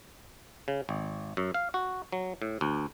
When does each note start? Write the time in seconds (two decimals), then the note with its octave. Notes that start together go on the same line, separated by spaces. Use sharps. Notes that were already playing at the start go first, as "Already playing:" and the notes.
0.68 C#3
0.89 G#1
1.37 F#2
1.54 F5
1.74 F#4
2.12 F#3
2.42 A2
2.61 D2